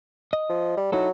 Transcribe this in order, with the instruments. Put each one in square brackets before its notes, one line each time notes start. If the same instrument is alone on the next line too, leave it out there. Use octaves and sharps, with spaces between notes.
[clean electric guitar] D#5
[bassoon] F3
G3
[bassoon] F#3 [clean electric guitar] D#4 E4 A4